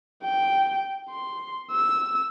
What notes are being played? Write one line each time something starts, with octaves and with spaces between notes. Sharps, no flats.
G5
C6
E6